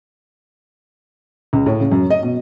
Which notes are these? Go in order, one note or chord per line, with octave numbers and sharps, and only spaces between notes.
C#2
A2
C#3
F#2
D#5
B2